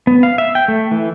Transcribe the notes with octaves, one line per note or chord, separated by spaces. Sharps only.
B3
F5
E5
G5
A3
E3